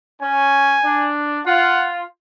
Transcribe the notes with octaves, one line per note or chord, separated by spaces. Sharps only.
C#4 G#5
D4
F4 F#5